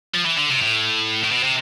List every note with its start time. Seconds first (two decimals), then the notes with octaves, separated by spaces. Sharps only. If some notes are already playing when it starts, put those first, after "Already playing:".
0.15 F3
0.26 E3
0.38 D3
0.50 C3
0.62 A2
1.24 A2
1.31 B2
1.43 C3